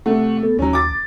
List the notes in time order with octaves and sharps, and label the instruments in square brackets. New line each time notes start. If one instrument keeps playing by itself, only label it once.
[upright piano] C3 A3 [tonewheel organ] F#5 C#6
[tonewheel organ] B3 A4
[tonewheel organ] D#2 [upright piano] F#3 C#4
[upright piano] D6 A6